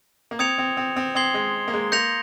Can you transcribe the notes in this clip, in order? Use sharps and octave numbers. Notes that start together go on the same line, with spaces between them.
A#3
C4 D#6 G#6 C#7 F7
C4
C4
C4
C4 C6 D#6 G#6 C7 G7
G#3
A#3
G#3
A#3 C6 G6 A#6 C#7 F7